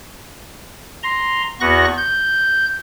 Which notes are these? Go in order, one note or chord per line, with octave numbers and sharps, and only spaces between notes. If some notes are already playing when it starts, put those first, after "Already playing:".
A#5 C6
E2 B3 F#4 C#6 F#6 A#6
G6